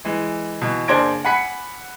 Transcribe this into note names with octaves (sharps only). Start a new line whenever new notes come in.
E3 G#3
B2 E3
F#1 D4 C5 G#6 A#6 D7
F#5 G#5 B5 B6 C#7